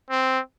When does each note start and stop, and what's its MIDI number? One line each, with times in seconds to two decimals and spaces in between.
0.11 0.40 60